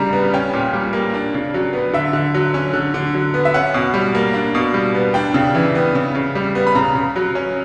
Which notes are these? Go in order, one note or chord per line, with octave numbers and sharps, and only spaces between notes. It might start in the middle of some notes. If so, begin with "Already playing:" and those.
Already playing: C#3 G3 D4 A#5
B3
C#4 G5
A#2
G3
A#3
D4
C#3
F#3
B3
D3 E5
D3
F#3
C#4
D3
D3
F#3
B3
E5
C#4 F#5
B2
G3
A#3
D4
B2
G3
B3
D4 G5
C#3
E3
B3
C#3
C#3
G3
B3
B5
C#3 A#5
C#3
F#3
C#4